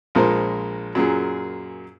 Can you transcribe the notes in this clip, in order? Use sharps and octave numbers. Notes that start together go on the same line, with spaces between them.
A#1 A#2 G#3 A#4 C5
F#2 A#2 G#4